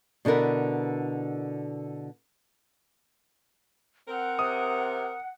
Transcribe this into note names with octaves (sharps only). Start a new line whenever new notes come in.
B2 D3 E4 A#4 B4
C4 A#4 F#5
C3 D#6